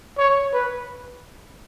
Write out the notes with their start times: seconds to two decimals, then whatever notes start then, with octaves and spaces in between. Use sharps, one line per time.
0.18 C#5
0.53 B4